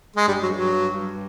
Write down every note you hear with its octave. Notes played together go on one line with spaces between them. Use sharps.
G#3
G2 G3
F#3
G2
F#3
G2
G2